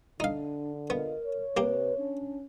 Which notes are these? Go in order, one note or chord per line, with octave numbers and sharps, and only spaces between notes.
D3 D4 D#4 F5
B3 F4 A#4 D#5 F5
C#5
C3 A#3 G4 B4
C#4 D4